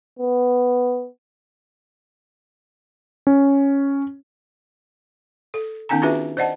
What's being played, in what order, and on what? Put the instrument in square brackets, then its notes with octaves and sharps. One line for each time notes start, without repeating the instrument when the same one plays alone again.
[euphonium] B3
[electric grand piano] C#4
[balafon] A4
D#3 B3 C#4 D#4 G#5 A#5
D4 F4 F#4 G#4 B4 E5
C5 D5 D#5 F#5 A5